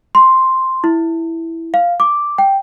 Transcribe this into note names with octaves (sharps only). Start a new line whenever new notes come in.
C6
E4
F5
D6
G5